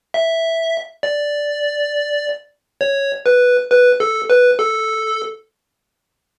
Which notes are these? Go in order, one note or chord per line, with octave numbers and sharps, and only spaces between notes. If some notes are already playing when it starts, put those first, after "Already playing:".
E5
D5
C#5
B4
B4
A4
B4
A4